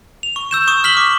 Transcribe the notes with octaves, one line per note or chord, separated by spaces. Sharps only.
F7
C#6
E6 G6 E7
C#6 D#6 E7
F6 B6 F#7 G7
D6